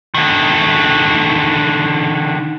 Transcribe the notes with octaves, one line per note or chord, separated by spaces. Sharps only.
D3 D#3